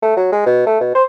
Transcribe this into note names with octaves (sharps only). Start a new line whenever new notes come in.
A3
F#3
G#3
B2
A3
B2
C5